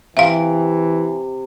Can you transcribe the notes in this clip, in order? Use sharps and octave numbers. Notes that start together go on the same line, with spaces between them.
C3 E3 E5 F5